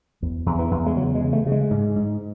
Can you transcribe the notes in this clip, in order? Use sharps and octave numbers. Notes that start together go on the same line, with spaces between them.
E2
E2
E3
E2
G#3
C#3 F#3
G#3
C#3
A3
C#3
G#3
G#2
G#2